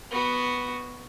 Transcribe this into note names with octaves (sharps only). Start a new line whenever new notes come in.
B3 F#4